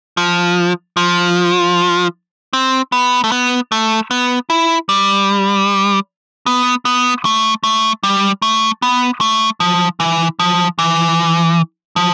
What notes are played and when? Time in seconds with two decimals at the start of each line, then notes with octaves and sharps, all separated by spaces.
0.17 F3
0.97 F3
2.53 C4
2.92 B3
3.24 A3
3.32 B3
3.72 A3
4.11 B3
4.50 E4
4.89 G3
6.46 B3
6.85 B3
7.25 A3
7.64 A3
8.03 G3
8.42 A3
8.82 B3
9.21 A3
9.60 F3
10.00 E3
10.39 F3
10.79 E3
11.96 F3